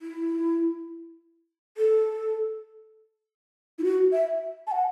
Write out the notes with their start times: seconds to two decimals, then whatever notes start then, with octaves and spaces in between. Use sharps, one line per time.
0.02 E4
1.77 A4
3.79 E4
3.84 F#4
4.12 E5
4.67 A5
4.72 F#5